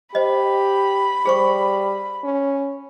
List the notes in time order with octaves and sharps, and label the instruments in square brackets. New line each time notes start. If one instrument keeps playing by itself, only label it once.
[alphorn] G4 [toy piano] C5 D#5 [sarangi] B5
[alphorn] G3 [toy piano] G#4 C5 C#6
[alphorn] C#4